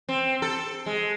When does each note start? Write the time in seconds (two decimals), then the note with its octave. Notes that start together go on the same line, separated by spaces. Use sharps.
0.09 C4
0.42 A4
0.86 G#3